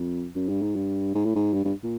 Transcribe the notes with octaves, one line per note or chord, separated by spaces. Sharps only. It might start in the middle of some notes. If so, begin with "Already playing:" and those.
Already playing: F2
F#2
G2
G#2
G2
G#2
A2
G#2
G2
G2
A#2